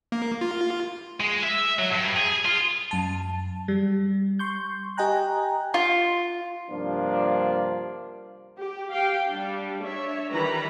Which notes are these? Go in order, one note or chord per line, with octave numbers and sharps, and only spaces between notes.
A#3
F4
G#3
E5
F#3
G2
G#4
F4
F#2 A5
G3
C6 C#6 G6
G4 D#5 G5 G#5 A#5 F#6
F4
G2 C3 F3 A#3 D4 F4
G4
G4 F5 G5
G3 D4
D4 C#5 E5
D#3 E3 G3 B4 A#5 B5